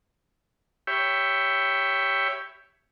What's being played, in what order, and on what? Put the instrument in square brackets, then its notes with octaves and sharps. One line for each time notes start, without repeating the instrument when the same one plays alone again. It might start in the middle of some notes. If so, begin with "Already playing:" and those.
[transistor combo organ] G4 C#5 E5 G5 B5